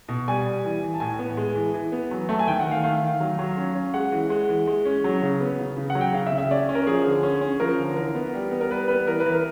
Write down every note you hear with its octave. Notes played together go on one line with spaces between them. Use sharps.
B2
G3 G#5
G3
E3
E3
A5
A2 G#5
B3
G#3
E3
E3
B3
F#3
A3 A5
G#5
D#3 G5
F#5
D#3
F5
A3 F5
D#3
F#3
F#3
C#4
C#4
G#3 F#5
E3
G#3
E3
G#3
C#4
F#3
C#3
B3
C#3
C#3
F#5
F#3
G5
C#3 F5
E5
C#3
E5
C#4 D5
C#4
A#4
F3 G#4
D3
C#4
C#4
F3 A#4
D3
E3 A#4
B3
G3
B3
A#4
G3 B4
B3 B4
E3 A#4
B4
E3
A#4